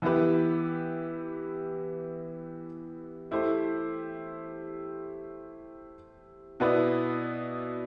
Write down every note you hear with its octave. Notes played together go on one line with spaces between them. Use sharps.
E3 B3 E4 G4 B4
A3 E4 G4 C5
B2 B3 E4 B4 D5